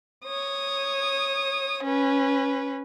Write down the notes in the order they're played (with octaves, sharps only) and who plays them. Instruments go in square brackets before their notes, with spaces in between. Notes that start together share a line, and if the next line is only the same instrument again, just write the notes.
[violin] C#5 D#6
C#4 B4